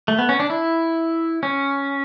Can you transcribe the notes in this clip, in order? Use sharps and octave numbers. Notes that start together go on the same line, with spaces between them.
A3
B3
C#4
D4
E4
C#4